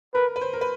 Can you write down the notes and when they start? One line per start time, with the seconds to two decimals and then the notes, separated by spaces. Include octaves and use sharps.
0.14 A#4 B4
0.36 B4
0.41 C5
0.53 A#4
0.61 B4